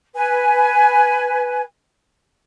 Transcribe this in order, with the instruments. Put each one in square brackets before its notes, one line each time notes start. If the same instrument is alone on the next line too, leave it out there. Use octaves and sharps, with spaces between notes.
[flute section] B4 G#5